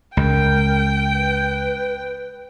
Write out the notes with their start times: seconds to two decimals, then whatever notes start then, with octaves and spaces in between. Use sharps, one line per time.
0.17 C#2 A#4 G5
1.13 B4